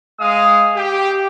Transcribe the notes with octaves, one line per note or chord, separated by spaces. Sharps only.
G#3 F5 D#6
G4